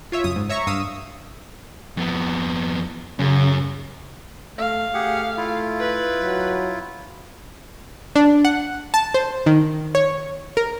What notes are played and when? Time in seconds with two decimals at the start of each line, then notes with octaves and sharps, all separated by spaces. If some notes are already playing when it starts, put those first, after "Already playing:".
0.12 F4 C#5 E5
0.24 F#2 C#3 D#6
0.36 G#2
0.49 C#5 E5 A#5 C#6
0.67 G2 F5 D#6 E6
1.97 F2 B3
3.19 F#2 C#3
4.58 A3 F5
4.94 A3 G4 G#4 F#5
5.37 E4 F4
5.80 B4
6.21 F#3
8.16 D4
8.45 F#5
8.94 A5
9.14 C5
9.46 D#3
9.95 C#5
10.57 A#4